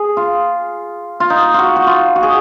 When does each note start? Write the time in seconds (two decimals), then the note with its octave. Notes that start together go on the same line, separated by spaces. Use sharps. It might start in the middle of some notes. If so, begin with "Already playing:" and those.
Already playing: G#4
0.17 F4
1.20 F4
1.30 D#4
1.54 F4 F#4
1.76 F#4
1.87 F4
2.16 F#4
2.23 G#4